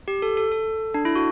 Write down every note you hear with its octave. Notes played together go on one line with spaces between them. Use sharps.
G4
A4
A4
A4
D4
E4
F#4